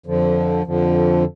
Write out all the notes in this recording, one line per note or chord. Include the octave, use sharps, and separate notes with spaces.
F2 D3 F3
F2 D3 F3